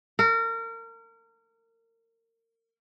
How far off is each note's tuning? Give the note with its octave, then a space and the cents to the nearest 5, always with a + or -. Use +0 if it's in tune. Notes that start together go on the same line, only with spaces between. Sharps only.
A#4 -30